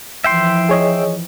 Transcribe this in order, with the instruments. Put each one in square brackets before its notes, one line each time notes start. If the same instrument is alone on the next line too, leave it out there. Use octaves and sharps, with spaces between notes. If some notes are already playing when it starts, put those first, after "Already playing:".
[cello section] E3 F3 [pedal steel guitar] E5 G5 C6
[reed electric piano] G#4 C#5 D#5